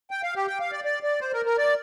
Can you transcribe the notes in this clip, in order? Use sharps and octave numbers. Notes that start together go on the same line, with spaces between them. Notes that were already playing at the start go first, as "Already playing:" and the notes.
G5
F5
G4
G5
F5
D5
D5
D5
C5
A#4
A#4
D5